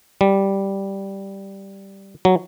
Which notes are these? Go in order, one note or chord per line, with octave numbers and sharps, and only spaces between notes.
G3
F#3